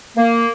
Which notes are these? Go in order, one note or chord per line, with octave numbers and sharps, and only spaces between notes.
A#3